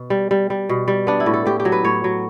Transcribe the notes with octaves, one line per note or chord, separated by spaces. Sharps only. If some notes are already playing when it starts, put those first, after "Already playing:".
Already playing: B2
G3
G3
G3
B2
G3
B3 D4
E4
A2
A4
A2 G4
G4
F#3
B4
A2 C#5
F#3